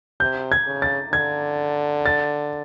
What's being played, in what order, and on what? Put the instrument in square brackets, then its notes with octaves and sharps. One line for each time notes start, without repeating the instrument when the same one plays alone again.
[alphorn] C3 [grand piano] G6
[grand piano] G#6
[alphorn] C#3
[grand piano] A6
[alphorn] D3 [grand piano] G#6
[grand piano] A6